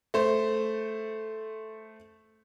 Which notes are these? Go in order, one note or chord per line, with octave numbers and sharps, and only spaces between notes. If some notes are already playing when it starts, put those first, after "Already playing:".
A3 C5